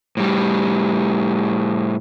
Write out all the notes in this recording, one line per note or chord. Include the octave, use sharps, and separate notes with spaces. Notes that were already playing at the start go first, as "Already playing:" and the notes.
A2 G3